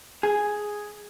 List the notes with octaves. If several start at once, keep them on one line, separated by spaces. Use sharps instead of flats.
G#4